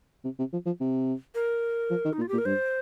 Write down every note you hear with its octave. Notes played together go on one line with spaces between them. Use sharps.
C3
C3
F3
F3
C3
A#4
F3
D#3
D#4
A#2
F4
G4
A#2
A#4
G2 C5